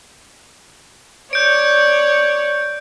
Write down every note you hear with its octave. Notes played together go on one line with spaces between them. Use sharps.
C#5 D5 G6 D7